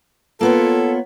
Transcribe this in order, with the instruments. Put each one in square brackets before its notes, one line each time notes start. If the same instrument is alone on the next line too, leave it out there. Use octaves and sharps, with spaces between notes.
[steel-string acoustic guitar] A#3 B3 C#5 [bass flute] F4 [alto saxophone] A4